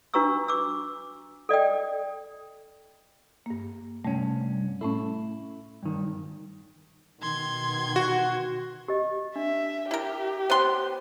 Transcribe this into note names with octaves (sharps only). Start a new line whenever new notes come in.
D4 F#4 B4 A#5 C#6 E6
D6 E6
A4 D5 D#5 G5
G2 A#3
C2 G2 G3 A3 C#4
A2 A3 C#4 E4
G2 D#3
B2 D#3 C6 G#6
F#4
G4 D#5
D4 E5
E4 G4 A#4
B3 C5 C#5 G5 C6